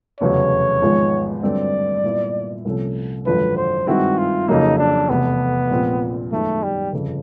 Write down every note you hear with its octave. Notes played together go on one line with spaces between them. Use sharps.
F1 E2 C#3 F#3 C#5
G#1 G#2 F3 G#3 B3
G2 D3 F#3 A3 C4 D5
A#2 G3 B3 E4
C2 C3 F3 A3 C#4
G#1 F#2 D3 F3 B4
C5
G2 D#3 G#3 C4 E4 F#4
F4
F2 C#3 F#3 A#3 D#4
D4
F1 E2 C3 B3
A#1 A#2 F3 G#3 C4
F#2 D#3 G#3 A3 B3
G3
G1 F2 C#3